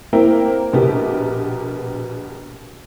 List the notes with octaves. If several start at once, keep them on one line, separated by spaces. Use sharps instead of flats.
A#3 C4 E4 A#4 G5
A#1 B2 B3 G4 A#4